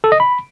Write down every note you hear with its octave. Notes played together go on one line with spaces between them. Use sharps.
A4
D#5
B5